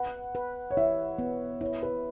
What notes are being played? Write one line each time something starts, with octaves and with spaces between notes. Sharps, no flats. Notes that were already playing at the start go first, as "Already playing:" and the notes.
Already playing: B4 F#5
B4
C#5
E4 E5
B3
E4 C#5
B4